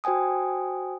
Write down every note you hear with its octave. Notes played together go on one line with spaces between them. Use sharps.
F#4 C5 G5 G#5 D#6